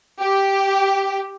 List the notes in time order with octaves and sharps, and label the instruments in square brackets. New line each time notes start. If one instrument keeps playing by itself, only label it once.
[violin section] G4